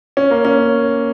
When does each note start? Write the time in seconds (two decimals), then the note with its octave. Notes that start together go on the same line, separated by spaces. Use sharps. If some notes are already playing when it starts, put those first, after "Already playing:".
0.17 C#4
0.30 A#3
0.45 C#4